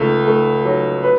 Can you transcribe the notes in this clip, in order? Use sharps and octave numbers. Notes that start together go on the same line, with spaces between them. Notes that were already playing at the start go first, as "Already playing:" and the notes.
Already playing: C#2 A3
A3
F#3
B4